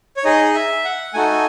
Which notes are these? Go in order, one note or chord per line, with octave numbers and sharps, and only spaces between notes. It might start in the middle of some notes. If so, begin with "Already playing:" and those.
C#5
D#4 G#4 D#5
E5
F#5
A3 D#4 F#4 A4 G#5